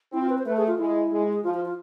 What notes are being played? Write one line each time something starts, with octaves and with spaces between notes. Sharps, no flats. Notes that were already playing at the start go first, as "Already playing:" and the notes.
C4 E4
F4
B4
C5
A3 B4
G#4
F4
G#3 E4
G#3
G#4
F3 F4
F4
F4